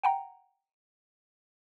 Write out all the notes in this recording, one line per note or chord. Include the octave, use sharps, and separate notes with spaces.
F#5 G5 A#5